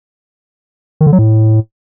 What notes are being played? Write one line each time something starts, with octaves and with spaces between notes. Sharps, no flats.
D#3
D3
F#3
A2